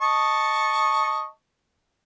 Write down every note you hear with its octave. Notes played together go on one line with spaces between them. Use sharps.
D#5 A5 C#6